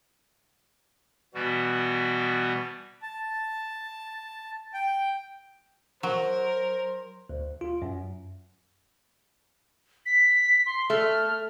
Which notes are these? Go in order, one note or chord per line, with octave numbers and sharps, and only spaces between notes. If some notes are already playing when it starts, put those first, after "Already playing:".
B2 E3 G3 B3 F#4
A5
G5
F#3 A#4 C5
D2
F4
F#2
B6
C6
A3 F6